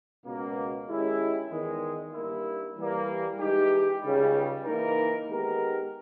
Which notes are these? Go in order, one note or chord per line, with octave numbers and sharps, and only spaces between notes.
C#2 B2 A#3
D#3 G#3 C#4 E4 G4
E2 D#3 G#3
G2 G3 A#3 E4
E3 G3 A#3
E3 G#3 D#4 G4
C#2 C#3 G3
E3 A#3 D#4 A#4
D#3 G#3 B3 G4 A#4